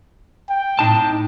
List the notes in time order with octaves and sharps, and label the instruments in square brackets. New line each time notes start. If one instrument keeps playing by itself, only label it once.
[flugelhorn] G5
[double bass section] A2 [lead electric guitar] D#4 A5